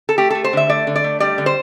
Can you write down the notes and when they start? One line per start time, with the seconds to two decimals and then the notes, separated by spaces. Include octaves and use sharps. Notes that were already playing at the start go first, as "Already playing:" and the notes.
0.09 A4
0.18 A3 G4
0.30 A3 A4
0.44 C5
0.53 D3 E5
0.69 A3 D5
0.87 D3
0.96 D5
1.04 A3
1.20 G3 D5
1.38 D3
1.46 C5